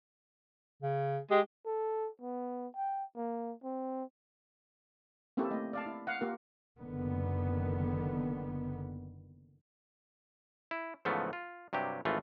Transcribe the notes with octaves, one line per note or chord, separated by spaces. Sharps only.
C#3
G#3 G4
A4
B3
G5
A#3
C4
A#3 C4 C#4 E4 G4 A4
A3 D#5
D5 F5 A5
E4
F5 F#5
A#3 F4 G4 A#4
F#1 D3 D#3 B3
E4
G#2 C#3 E3 F3 A3 B3
F4
G2 C3 F#3 G4
G#1 E3 A3 F4